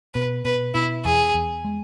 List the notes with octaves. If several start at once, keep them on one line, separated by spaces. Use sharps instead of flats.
B2 B4
B2 B4
B2 E4
E2 G#4
E2
G#3